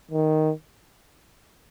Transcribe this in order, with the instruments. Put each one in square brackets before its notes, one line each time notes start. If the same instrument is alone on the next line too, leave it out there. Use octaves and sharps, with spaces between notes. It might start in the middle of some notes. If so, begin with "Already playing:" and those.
[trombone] D#3